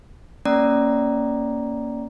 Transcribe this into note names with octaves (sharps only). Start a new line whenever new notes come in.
A#3 C#4 D5 A#5